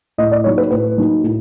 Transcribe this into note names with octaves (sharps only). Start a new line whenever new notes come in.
A2 D#5
D5
F#3 A#3 D#4 C#5
B4
A2 B4
F#3 A#3 D#4
A2